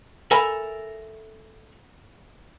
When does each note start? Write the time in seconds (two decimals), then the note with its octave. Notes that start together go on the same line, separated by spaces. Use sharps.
0.31 A4 A#4 E5 G#5 B5